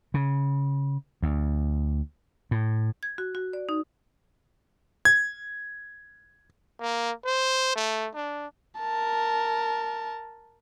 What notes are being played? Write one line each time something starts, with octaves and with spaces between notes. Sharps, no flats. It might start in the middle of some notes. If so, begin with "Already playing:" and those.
C#3
D2
A2
G#6
F#4
F#4
D5
D#4
G#6
A#3
C5
A3
D4
A#4 A5